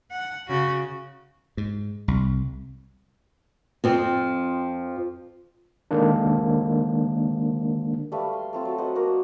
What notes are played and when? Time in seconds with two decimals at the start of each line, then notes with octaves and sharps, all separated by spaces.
0.11 F#5
0.48 C#3 F#4
1.57 G#2
2.08 C2
3.84 F2 F3 C4
5.91 D3 D#3 G#3 A#3 D4
8.12 G3 A3 B4 F5
8.33 C6
8.53 A3 C4 F4
8.65 F#3 A4
8.78 B4 C5 D#5 F#5
8.95 A#3 F#4 A#4